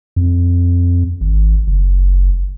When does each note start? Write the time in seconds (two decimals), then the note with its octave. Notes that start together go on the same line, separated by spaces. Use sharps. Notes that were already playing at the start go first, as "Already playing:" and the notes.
0.16 F2
1.21 G#1
1.67 F#1